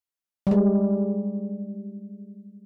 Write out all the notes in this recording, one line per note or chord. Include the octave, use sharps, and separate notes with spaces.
G3 G#3